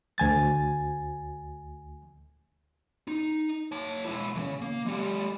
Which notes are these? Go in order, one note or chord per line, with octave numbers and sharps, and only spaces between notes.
D2 G#5 A6
D#4
C#5 A5
G#3 E4
E2 C#3
A#3
G#3 G4